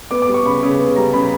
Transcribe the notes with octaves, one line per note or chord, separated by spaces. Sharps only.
B3 D6
D6
G3
C#6
C#3 B5
C#3
B3
G3 A#5
C#3 B5